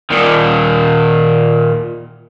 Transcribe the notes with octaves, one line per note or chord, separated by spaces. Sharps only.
A#2 D#3